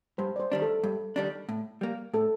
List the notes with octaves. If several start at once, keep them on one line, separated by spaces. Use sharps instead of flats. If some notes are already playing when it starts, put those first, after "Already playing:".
G2 C5
D5
C5
D#3 G3 D4
A4
G2
D#3 G3 D4
A2
G3 A#3
A2 A4